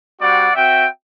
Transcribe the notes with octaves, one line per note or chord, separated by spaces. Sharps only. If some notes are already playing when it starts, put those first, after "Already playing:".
G3 C4 F#4 D5 F#5
C4 F#4 E5 G5